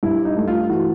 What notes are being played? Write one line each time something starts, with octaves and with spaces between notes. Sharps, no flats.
G2 E4
D#4
A3
F4
E3 F#4